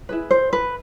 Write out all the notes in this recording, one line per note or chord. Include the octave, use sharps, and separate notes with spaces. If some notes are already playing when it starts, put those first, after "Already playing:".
E4 G#4 B4
C5
B4